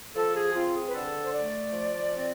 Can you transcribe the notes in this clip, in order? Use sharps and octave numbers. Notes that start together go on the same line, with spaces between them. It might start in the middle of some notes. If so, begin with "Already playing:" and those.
F3 A4
G#4
C4 F4
G#4
B4
D3 A4
C5
A3 D5
F3
C4